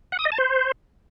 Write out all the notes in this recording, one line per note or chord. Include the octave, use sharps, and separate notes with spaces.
F#5
D#6
D#5
A5
C5